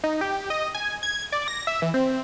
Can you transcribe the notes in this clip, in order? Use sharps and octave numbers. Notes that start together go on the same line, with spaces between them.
D#4
G4
D#5
G#5
G#6
D5
A#6
E5
E3
C4